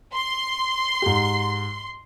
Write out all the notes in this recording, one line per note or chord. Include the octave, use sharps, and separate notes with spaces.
C6
G#2 G4